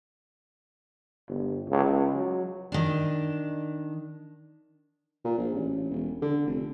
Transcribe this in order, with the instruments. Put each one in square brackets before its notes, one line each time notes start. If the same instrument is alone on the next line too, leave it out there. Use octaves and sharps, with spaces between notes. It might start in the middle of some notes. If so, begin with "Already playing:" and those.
[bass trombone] G1
C#2
F#3
[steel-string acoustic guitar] D#3 D4
[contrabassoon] A#2
A#1
A1
E1
D3
F1